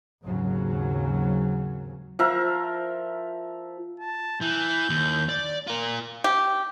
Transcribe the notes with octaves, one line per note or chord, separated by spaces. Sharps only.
G#1 D#2 G#2 C#3 F#3
F3 A#4 E5
A5
E3 G6
D#2
D5
F4 A#4
G4